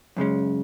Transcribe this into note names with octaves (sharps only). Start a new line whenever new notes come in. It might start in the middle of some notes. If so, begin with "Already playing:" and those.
F#2 C#3 G#3 C#4